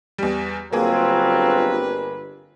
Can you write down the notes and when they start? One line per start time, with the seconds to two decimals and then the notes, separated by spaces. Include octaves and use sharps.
0.18 E2 G3
0.73 G1 F#3 A#3 C4 F4 G#4 B4